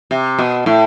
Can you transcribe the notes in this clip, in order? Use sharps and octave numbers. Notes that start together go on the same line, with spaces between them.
C3
B2
A2